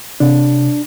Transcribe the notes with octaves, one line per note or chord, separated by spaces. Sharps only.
C3 D4